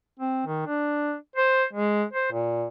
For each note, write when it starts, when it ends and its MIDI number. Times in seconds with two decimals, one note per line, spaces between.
0.20 0.44 60
0.47 0.63 51
0.67 1.16 62
1.36 1.65 72
1.73 2.04 56
2.13 2.29 72
2.32 2.67 46